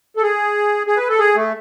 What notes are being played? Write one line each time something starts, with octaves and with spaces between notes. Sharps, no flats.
A4
G#4
G#4
B4
A4
G#4
A3